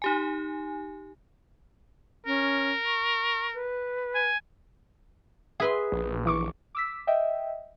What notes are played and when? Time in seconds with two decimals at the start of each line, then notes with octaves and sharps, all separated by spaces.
0.02 D#4 G4 G#5
2.26 C#4 A#4
2.86 C#6
3.54 B4
4.15 G#5
5.60 G#4 B4 E5 C6
5.92 A#1
6.26 E3 C#6 D6
6.75 D6 E6 B6
7.07 D#5 E5 G5